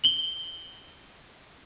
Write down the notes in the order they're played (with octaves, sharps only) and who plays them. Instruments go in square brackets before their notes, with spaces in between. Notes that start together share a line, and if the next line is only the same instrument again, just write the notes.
[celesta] F#7 G7